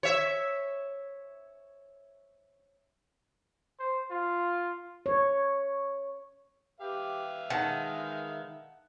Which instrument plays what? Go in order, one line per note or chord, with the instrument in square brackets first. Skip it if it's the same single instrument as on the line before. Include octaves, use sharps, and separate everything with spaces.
[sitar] C#5 E5
[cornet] C5
F4
[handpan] C#5
[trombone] G4 [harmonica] B4 E5 F5
[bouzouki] D#3 [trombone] G#3 [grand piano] F#5 A5